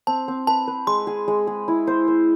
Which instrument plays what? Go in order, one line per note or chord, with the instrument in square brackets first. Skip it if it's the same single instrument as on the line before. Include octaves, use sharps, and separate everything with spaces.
[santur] C4 [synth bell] A5
[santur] C4
[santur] B4 [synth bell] A5
[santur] B4
[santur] G#3 [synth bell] C6
[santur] G#4
G#3
G#4
E4
C5
C5